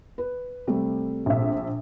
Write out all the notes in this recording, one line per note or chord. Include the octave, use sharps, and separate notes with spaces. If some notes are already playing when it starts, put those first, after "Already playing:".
B4
C3 G3 A3
A#1 E5